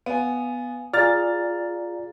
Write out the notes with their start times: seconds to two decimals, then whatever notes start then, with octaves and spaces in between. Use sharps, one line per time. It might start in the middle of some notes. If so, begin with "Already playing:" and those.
0.06 B3 F5 G#5
0.94 F4 G#4 D5 F5 A#5 F6 A6